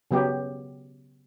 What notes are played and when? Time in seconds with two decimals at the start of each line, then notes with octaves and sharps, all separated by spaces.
0.11 C#3 F#3 B3 G4